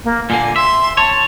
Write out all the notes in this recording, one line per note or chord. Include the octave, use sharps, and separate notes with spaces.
A#3
A#2 D3 A#3 G#5
E5 C6
C#5 A5